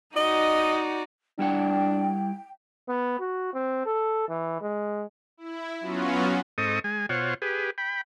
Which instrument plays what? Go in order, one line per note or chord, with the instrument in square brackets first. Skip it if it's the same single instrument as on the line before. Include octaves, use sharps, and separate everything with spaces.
[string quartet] D#4 F#4 D5 [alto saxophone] D#5
[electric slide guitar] G3 E4 F#5 [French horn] D4 [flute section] G5
[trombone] B3
F#4
C4
A4
E3
G#3
[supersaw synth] E4
F#3 B3 C#4 F4 F#4
[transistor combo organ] G#2 C4 A4 D#5 C#6 D#6
G#3 G#5
B2 F4 C5 C#5 F#5
G4 G#4 B4
G5 B5